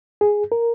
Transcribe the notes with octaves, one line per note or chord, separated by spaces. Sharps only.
G#4
A#4